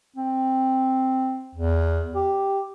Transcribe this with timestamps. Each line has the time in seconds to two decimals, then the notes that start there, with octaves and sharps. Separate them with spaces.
0.16 C4
1.55 E2
2.15 G4